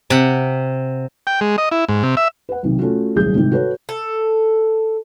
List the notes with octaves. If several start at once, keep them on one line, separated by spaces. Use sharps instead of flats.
C3 F#5
G5
G#3
D#5
E4
G#2
C3
E5
B4 F#5
B1 C3 D#3
A3 C#4 F4 F#4
D#1 C2 F#3 C#4 G#4 G6
G1 G#2 C3 D#3
F#4 A4 B4 C#5
A4